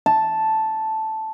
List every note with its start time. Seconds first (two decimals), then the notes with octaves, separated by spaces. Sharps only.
0.06 A5